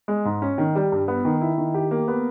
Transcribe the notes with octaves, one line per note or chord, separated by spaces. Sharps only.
G#3
G#2
C#4
D#3
G3
G2
B3
D#3
E4
D#3
G4
A#3
B3